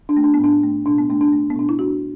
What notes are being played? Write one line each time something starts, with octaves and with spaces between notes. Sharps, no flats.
D4
A3
D4
B3
A2 D4
A3
B2 D4
B3
A3 D4
D4
A3
B3
B2 D4
E4
A3 D4 F#4